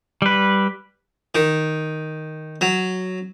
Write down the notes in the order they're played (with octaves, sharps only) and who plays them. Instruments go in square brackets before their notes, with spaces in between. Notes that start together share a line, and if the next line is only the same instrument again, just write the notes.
[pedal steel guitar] G3 B4
[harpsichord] D#3
F#3